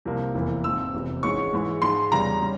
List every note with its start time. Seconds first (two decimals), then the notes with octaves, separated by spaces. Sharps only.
0.05 C2 C3 F3 A#3
0.35 F1 E2 E3 A#3
0.64 G#2 F3 C4 E6
0.94 F1 E2 C3
1.23 G#1 G#2 E3 G#3 C#4 C#6
1.53 G#2 E3 G#3 E4
1.82 G#2 F3 G#3 C6
2.11 E2 C#3 G3 C#4 A#5
2.42 G3 C#4